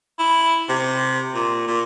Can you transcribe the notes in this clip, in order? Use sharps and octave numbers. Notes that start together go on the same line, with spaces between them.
E4
C3
A#2
A#2